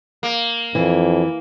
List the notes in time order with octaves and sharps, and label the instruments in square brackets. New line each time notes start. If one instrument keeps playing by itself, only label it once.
[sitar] A#3
[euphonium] F2 [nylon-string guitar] E3